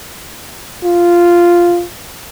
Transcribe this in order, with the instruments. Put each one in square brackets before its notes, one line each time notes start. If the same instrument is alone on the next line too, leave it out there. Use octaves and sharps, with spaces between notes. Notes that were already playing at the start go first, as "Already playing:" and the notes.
[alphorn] F4